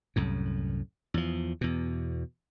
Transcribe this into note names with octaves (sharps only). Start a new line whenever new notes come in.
C2 F#2 A2
E2 F3
E2 B2